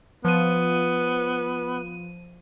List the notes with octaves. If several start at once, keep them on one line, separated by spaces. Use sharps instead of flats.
F3 B3 D#7